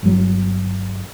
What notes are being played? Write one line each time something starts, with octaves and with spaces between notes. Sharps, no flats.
G1 F#3